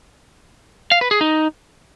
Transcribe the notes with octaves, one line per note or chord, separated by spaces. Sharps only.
F5
B4
G#4
D#4